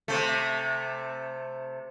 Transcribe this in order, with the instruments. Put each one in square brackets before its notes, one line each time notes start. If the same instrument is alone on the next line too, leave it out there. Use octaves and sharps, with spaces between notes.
[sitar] C3 A3